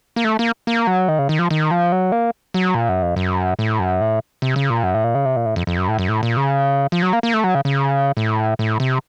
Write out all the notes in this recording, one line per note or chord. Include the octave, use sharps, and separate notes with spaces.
A#3
A3
A#3
A#3
F#3
D#3
C#3
D#3
F3
D#3
F3
F#3
A#3
F#3
A#2
F#2
F2
F#2
A2
F#2
A2
C3
C#3
A#2
F#2
A2
A#2
C#3
C3
A#2
A2
F2
F2
F#2
A2
F#2
A2
A#2
C#3
F3
F#3
A#3
A#3
A3
F#3
C#3
C#3
A2
A2
C3